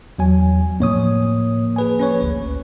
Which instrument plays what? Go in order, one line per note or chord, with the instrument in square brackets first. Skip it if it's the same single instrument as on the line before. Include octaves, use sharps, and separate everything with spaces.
[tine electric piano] E2 F#3 G#5
[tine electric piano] A2 C#5 D#6 [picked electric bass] F3 A#3
[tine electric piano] G#4 B4 G#5
C#4 B4 C#5
G#1 D2